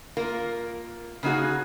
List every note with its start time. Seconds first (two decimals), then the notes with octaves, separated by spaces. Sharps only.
0.17 A#3 F4 A#4
1.23 C#3 A#3 D#4 F#4 G#4